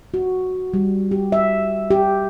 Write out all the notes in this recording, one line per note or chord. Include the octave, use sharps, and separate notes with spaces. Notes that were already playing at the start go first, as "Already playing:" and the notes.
F#4
G3
G4
E5
G4